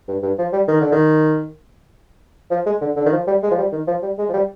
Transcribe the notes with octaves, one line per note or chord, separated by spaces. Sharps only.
G2
G2
F3
G3
D#3
D3
D#3
F3
G#3
D3
D3
D#3
F3
G3
G#3
F3
G3
D#3
F3
G3
G#3
F3
G3